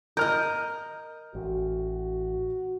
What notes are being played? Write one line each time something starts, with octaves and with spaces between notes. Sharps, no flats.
A#4 D#5 F6 G6
A1 F#4